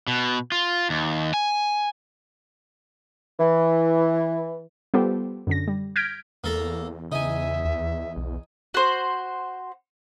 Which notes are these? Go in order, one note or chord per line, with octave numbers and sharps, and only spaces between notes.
B2
F4
D#2
G#5
E3
G3 B3 F4 G4 A4 C5
F#2 D3 A#6
G3
F6 G6 G#6 A#6 B6 D7
E2 A#3 A4 A#5
C#3 D#4 E5 G#5
D#2
B1
F#4 C5